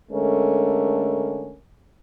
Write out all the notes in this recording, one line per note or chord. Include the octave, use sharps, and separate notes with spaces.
D3 G#3 A3 C#4 A#4